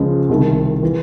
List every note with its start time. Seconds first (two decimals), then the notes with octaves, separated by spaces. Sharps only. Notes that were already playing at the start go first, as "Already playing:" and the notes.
Already playing: C#2 C#3 F3 G#3
0.29 C2 C3 D#3
0.83 E3